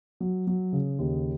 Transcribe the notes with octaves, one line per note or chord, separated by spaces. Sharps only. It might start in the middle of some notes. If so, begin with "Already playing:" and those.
F#3
F#3
C#3
D#2